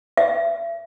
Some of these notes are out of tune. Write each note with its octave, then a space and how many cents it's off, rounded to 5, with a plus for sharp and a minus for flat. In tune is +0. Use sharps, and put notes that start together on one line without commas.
E5 +35